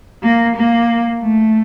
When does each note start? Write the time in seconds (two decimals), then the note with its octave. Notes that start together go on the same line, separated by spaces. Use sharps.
0.23 A#3
0.56 A#3
1.22 A3